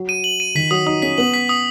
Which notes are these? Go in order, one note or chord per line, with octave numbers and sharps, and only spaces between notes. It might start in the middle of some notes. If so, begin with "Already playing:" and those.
Already playing: F#3
D#7
F#7
D#7
D#3 B6
F#3 D#6
D#4 D#6
C#4 B6
B3 F#7
B6
D#6